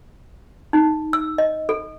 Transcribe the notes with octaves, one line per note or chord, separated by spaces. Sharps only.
D#4
E6
D#5
A4